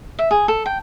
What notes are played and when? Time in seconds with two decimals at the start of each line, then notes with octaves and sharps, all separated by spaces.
0.19 E5
0.31 G#4
0.48 A4
0.66 G5